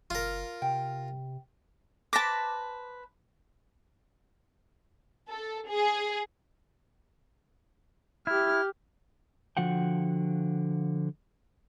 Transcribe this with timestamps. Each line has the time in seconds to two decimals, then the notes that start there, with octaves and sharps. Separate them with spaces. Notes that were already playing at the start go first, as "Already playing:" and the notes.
0.10 F#1 F4 A#4
0.62 C3 G5
2.13 B4 C5 A5 D6 A#6 B6
5.30 A4
5.69 G#4
8.27 E4 G4 F6
9.57 D3 F3 F#4 F#5 G5